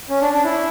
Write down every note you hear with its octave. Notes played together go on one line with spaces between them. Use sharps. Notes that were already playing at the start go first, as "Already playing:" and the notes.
C#4
D4
D4
E4